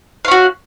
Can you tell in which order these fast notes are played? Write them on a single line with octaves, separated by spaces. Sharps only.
F5 C#4 F#4